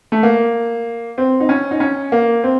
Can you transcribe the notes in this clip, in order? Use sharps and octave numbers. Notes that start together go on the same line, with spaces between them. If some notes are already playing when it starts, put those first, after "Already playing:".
A3
A#3
C4
D#4
C#4
D#4
C#4
A#3
C4